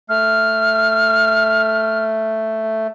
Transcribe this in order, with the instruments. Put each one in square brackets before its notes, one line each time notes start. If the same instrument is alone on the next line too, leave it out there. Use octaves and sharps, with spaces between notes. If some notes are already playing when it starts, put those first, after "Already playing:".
[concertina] A3 [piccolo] F6